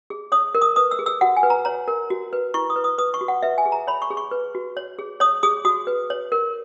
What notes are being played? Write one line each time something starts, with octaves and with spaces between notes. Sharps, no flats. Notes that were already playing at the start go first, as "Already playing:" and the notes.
G#4
C#5 D#6
A#4
D#6
B4 D#6
E6
G#4
E6
F#4 F#5
G#5
B4
A#5
C#5 A#5
A#4
F#4
B4
E4 C#6
D#6
B4
D#6
B4 D#6
C#6
F#4
F#5
B4 E5
G#5
G#4
A#5
C#5 B5
C#6
G#4
C#6
B4
F#4
C#5
G#4
C#5 D#6
G#4 D#6
F#4 D#6
B4
C#5
A#4